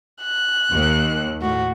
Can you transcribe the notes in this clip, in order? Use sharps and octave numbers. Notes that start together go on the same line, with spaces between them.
F#6
D#2
A2 F#4